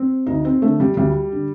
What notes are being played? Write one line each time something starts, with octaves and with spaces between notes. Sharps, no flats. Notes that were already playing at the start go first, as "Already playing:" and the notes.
Already playing: C4
D2 D#4
C4
D3 A3
G3
D2 G3
D3